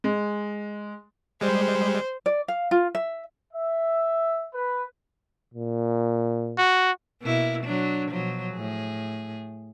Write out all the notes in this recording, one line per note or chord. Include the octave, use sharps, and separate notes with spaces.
G#3
G3 G#3 C5
D5
F5
F4
E5
E5
B4
A#2
F#4
B2 A#3 E4
F#3 D4
B2 F3 F#3
A2 G#4